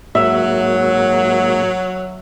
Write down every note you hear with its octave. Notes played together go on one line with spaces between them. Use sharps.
G#2 F#3 A#3 F#4 E5